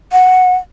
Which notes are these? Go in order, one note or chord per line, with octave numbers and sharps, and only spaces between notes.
F#5